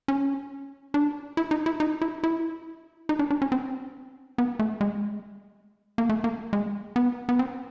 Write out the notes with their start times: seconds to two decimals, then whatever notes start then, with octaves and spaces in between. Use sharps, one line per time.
0.08 C#4
0.94 D4
1.37 E4
1.51 D#4
1.66 E4
1.80 D#4
2.02 E4
2.24 E4
3.09 D#4
3.19 D4
3.31 D4
3.42 C#4
3.52 C4
4.38 B3
4.59 A3
4.81 G#3
5.98 A#3
6.09 A3
6.24 A#3
6.53 G#3
6.96 B3
7.29 B3
7.39 C4